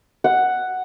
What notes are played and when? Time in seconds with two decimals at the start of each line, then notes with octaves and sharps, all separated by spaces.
0.24 F#5